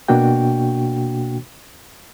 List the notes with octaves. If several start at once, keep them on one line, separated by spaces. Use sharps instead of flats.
B2 A#3 D4 F#4 G5